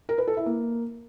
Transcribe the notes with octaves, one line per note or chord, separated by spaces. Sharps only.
A#4
B4
A4
E4
A#3